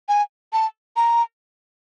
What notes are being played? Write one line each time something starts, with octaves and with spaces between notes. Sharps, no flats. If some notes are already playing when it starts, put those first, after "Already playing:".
G#5
A5
A#5